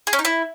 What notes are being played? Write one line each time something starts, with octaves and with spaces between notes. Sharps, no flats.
G#4
C#4
D#4
E4